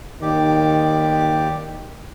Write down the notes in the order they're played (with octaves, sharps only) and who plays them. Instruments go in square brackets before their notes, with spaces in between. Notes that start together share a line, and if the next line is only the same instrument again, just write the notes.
[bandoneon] D#2 G4 D5 [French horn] D#3